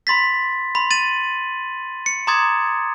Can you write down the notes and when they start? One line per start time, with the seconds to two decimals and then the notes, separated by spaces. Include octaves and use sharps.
0.07 B5 C6 A6 B6
0.75 B5 C6
0.91 A6 D#7 F#7
2.06 C#7
2.27 A#5 C6 D6 D#6 G#6 A6